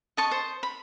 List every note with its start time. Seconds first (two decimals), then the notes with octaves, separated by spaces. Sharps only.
0.17 D#5 A5 C#6
0.31 C5
0.63 B5